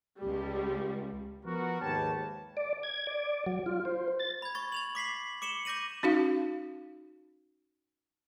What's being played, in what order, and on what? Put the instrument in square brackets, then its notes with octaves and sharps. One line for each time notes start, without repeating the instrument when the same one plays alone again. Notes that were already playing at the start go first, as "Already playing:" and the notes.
[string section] C#2 G3
[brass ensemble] F3 B3 F#4 A#4
D#2 G#2 G4 B4 C#5 A5
[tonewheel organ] D5
G#6
D5
F#3
F4
C5
A6
[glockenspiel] B5 G#6
C#6 A6
A6 F7 F#7
D6 B6 C7 F#7
D6 C#7 E7 F#7 G7
D6 G6 A#6 D#7 F#7
[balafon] C#4 D#4 F#4 F5